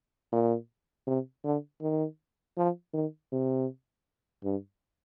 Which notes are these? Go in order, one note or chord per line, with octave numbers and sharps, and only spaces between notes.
A#2
C3
D3
D#3
F3
D#3
C3
G2